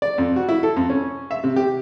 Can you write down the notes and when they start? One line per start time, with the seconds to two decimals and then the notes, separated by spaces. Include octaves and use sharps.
0.02 D5
0.18 F2
0.36 F#4
0.49 E4
0.63 A4
0.76 F2
0.90 C#4
1.31 E5
1.44 C3
1.56 G4